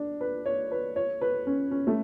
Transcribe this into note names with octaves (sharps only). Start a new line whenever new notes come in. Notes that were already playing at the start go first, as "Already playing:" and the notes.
Already playing: D4
B4
C#5
B4
C#5
B4
C#4
C#4
A3